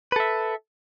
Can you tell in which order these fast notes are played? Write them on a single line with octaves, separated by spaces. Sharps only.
B4 A4 E5